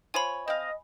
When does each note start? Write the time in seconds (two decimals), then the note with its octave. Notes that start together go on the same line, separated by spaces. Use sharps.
0.14 F4 C5 C#5 G#5 B5
0.48 C4 D#5 F5